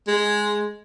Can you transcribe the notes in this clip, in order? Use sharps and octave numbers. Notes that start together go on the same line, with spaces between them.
G#3